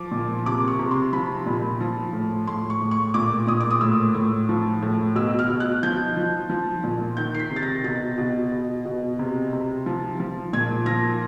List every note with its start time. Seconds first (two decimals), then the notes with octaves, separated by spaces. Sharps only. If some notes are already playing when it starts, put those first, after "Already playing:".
Already playing: F3 D6
0.12 A#2
0.46 C3 D6
0.68 C#6
0.79 C3
0.91 C6
1.13 F3 B5
1.46 A#2
1.80 F3
2.13 A2
2.47 A2 C6
2.70 C#6
2.81 A2
2.91 C#6
3.14 A#2 D6
3.47 A#2 D#6
3.60 D6
3.70 D#6
3.81 A2 E6
4.14 A2
4.49 F3
4.82 A2
5.15 B2 E6
5.39 F6
5.50 B2
5.60 F#6
5.83 F3 G6
6.17 F3
6.50 F3
6.84 A#2
7.17 D#3 G6
7.34 C7
7.39 B6
7.50 C3
7.56 A6
7.63 A#6
7.84 B2 A6
8.18 B2
8.52 B2
8.85 B2
9.19 C3
9.53 C3
9.86 F3
10.20 F3
10.53 A#2 G#6
10.86 F3 A#6